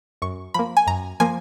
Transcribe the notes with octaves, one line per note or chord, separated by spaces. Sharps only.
F#2 C#6
F3 A#3 B5
G#5
F#2 A#5
F3 A#3 G#5